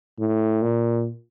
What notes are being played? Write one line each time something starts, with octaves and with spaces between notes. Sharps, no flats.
A2
A#2